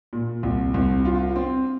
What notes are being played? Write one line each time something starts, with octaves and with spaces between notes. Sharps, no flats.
A#2
C2
C2
F4
C4